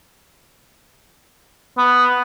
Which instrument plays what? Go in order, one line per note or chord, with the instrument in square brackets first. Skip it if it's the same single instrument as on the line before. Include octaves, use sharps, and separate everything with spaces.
[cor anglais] B3